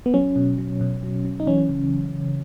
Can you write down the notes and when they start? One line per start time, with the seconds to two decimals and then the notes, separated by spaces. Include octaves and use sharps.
0.06 B3
0.14 F#3 C#4
0.36 B2
0.58 F#3
0.81 B2
1.03 F#3
1.25 F#3
1.40 D#4
1.47 E3 C#4
1.69 C#3